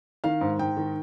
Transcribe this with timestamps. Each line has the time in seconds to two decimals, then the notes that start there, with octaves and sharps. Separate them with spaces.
0.24 D#3 F5
0.41 G#2
0.59 G#2 G5
0.77 D#3